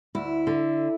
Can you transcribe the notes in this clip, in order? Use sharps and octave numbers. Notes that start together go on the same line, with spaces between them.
D2 E4
D3